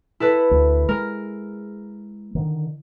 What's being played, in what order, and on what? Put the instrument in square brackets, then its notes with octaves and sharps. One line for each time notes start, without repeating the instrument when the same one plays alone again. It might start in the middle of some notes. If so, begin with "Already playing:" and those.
[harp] E4 A4 B4
[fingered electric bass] D2
[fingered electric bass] G#3 [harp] A#4
[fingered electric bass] D3 D#3